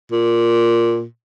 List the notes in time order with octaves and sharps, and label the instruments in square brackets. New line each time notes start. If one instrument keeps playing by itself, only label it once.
[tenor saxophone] A#2